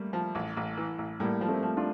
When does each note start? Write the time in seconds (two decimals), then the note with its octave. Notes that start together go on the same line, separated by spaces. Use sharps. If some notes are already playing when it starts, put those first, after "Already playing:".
Already playing: G3 A3 A#3
0.13 F3
0.35 A1
0.57 A1
0.77 E3
0.98 A1
1.20 A2 G3 A#3
1.41 F3
1.48 A3 C4
1.63 F3
1.77 D4 F4